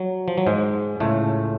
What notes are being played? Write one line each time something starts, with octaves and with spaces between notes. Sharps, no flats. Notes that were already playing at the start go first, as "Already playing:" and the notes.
Already playing: F#3
F3
F#3
G#2 G#3
C#2 A2 C#3 A3